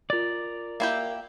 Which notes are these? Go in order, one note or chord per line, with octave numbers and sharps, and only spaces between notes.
F4 A#4 D5 A6
A#3 E4 G4